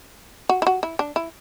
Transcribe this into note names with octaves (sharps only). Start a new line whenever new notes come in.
F#4
E4
F#4
E4
D4
E4